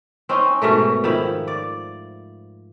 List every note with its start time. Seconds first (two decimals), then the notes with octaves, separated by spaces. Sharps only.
0.29 C4 C#4 D#4
0.62 G#2 B2 A3 A#4
1.04 D#3 F3 E4
1.48 D5